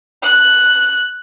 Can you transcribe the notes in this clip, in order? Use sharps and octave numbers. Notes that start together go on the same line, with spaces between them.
F#6